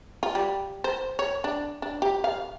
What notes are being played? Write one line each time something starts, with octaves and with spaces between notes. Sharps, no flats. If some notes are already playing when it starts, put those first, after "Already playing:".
F4
G3
C5
C#5
D4
D4
G4
F5